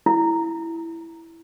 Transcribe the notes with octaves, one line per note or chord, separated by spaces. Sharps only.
E4